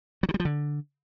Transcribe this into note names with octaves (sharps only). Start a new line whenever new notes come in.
F#3
D#3
G3
F3
D3